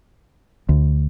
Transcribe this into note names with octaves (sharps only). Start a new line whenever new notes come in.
D2